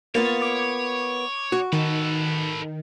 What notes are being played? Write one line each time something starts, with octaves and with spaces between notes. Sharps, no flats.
A#3 B3 F4 C#5 A6
D6
F#4
D#3 A4 B4